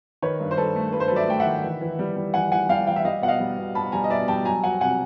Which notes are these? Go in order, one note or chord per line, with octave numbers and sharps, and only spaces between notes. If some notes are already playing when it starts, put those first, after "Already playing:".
D#3 B4 C#5
G2
C5
G2 A4 B4
A3
G2 B4
C5
F#3 A4 B4
D5 E5
A3 G5
E5 F#5
D#3
E3
E3
G3
G3
E3 F#5 G#5
E3 F#5 G#5
G3 F5 G5
E3 F5 G5
E5
G3 D#5 F5
B2 F#5
D#5 F5
G3
B2
B2 A5 B5
G3 G#5 A#5
D#5
B2 D5 E5
G3 G5 A5
F#3 G#5 A#5
F#3 F#5 G#5
C3 F#5 G#5